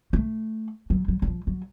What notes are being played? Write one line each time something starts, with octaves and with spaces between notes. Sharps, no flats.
A3
F#3
F#3
F#3
F3
F#3